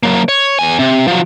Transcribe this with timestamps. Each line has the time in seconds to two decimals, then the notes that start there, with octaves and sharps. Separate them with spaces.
0.03 F#3 A#3
0.29 C#5
0.59 E2 G#5
0.79 C3
1.07 F3 F#3